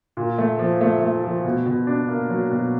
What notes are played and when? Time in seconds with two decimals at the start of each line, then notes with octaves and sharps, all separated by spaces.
0.17 A#2
0.38 A3
0.59 F3
0.81 A3
1.02 A3
1.24 F3
1.44 B2
1.66 B2
1.87 D4
2.08 A#3
2.30 F#3
2.51 B2